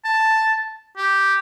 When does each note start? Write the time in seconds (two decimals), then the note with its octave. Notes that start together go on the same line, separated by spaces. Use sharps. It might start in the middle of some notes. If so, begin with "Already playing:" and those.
0.05 A5
0.97 G4